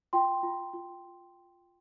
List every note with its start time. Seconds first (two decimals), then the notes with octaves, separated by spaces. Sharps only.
0.13 F4 G5 C6
0.43 F4
0.74 F4